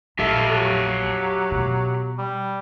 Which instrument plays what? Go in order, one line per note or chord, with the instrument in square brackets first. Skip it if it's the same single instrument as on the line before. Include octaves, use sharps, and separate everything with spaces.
[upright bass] A#1 [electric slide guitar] G4 E5 F5 [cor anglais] A4
[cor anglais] F#3
[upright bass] B2
[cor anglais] G3